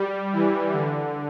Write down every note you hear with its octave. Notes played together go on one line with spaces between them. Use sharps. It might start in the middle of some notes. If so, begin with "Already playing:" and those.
Already playing: G3
E3
D3